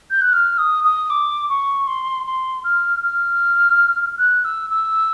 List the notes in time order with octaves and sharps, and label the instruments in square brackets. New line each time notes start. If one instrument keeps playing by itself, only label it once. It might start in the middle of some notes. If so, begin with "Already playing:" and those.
[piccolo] G6
F#6
F6
D#6
D#6
D6
C#6
C6
C6
F6
F6
F#6
E6
E6